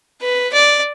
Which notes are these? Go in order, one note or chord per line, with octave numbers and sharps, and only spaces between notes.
B4
D5